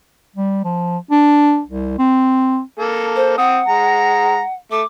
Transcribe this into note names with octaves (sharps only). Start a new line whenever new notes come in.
G3
F3
D4
C2
C4
A#3 A4
C5
C4 F#5 D#6
G#3 A#5
A3 D6